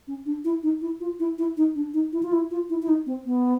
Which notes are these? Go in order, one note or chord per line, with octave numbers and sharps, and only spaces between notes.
C#4
D4
E4
D#4
E4
F4
E4
E4
D#4
D4
D#4
E4
F4
E4
F4
E4
E4
D#4
C4
B3